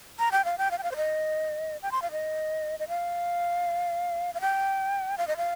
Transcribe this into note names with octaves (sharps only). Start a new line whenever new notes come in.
A#5
G5
F5
G5
F5
G5
F5
C5
D#5
G5
C6
F5
D#5
D#5
F5
F5
G5
F5
D#5
F5